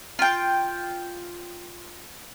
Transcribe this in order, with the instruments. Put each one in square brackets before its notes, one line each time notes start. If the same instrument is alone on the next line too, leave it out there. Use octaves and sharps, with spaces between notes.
[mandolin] F4 G5